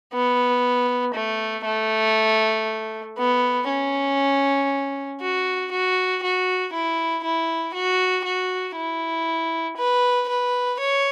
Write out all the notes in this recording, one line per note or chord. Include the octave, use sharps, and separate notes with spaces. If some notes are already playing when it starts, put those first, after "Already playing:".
B3
A3
A3
B3
C#4
F#4
F#4
F#4
E4
E4
F#4
F#4
E4
B4
B4
C#5